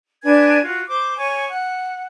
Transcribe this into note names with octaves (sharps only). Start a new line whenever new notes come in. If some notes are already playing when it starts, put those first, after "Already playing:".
D4 B4 G#5 G#6
F4 F#4
C5 D6
C#5 G#5 C#6
F#5